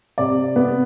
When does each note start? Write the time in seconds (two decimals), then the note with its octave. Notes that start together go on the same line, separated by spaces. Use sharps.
0.18 C3 D5
0.56 B3